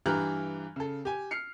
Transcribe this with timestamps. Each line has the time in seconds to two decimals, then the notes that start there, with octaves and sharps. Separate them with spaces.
0.06 G2 E3 G4 A#5 F6 F#6
0.76 C#3 A4
1.05 G4 G#5
1.31 F6 C7 C#7